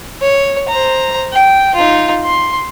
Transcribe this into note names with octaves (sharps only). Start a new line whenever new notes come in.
C#5
C5 A#5
G5
D#4 F4
C6